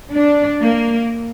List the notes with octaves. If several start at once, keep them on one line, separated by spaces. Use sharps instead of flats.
D4
A#3